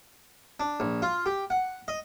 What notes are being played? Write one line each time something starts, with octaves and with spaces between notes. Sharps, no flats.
D4
A#1
F4
G4
F#5
D#5